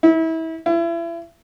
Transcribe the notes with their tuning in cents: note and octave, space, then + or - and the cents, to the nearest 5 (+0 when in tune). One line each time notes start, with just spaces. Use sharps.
E4 -30
E4 +35